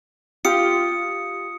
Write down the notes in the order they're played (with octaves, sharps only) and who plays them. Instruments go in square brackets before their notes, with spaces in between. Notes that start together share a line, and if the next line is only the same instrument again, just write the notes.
[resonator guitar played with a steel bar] F4 G4 [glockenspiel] D#6 C#7